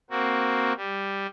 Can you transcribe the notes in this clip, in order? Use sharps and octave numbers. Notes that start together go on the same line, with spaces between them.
A#3 C4 F#4
G3